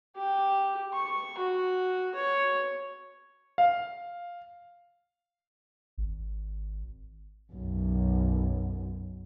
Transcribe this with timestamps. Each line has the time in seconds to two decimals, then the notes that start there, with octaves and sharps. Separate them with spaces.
0.16 G4
0.93 C#6
1.38 F#4
2.15 C#5
3.58 F5
5.98 G#1
7.52 B1 F#2